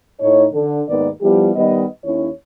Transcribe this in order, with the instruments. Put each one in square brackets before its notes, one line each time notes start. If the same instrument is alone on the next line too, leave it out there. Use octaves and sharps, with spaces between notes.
[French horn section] A2 D#4 C#5
D3
D#2 G#2 D#3 B3 A#4 D5
F3 G3 B3 E4 G4
D#3 G3 B3 B4 D#5
D#2 C#4 E4 C#5